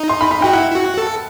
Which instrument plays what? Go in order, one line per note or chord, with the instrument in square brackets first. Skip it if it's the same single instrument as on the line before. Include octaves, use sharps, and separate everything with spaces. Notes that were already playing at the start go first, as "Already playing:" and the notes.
Already playing: [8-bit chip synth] D#4
[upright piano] C6
B5
B5
[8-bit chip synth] F#4 [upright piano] G5
[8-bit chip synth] E4 [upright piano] F#5
[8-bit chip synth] E4
F#4
A4